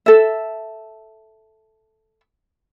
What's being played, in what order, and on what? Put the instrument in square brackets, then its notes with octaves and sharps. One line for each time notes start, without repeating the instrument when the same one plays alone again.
[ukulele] A4 E5